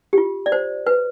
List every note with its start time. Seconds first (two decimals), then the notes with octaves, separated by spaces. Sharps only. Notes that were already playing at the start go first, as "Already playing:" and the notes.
0.13 G4
0.18 F4
0.46 D5
0.52 C5
0.87 B4